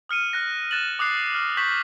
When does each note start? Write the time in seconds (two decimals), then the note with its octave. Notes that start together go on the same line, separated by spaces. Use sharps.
0.09 D#6 F6 C#7 D#7
0.33 F6 F#6 A#6
0.71 F#6 A6 E7 F#7
0.99 D6 D#6 F#6 C7
1.35 F6
1.57 C#6 G6 B6 F#7